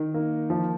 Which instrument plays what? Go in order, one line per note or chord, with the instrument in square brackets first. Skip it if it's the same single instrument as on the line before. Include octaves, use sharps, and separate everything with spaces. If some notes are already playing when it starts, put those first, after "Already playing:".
Already playing: [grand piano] D#3
A#3
F3